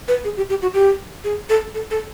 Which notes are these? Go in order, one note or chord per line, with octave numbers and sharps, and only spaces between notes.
B4
G#4
G4
G4
F#4
G4
G#4
A4
A4
A4